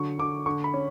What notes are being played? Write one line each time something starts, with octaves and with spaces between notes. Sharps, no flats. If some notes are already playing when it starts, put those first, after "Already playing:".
Already playing: D3 F#3 C#6
D3 D6
D3 C#6
B5
C#4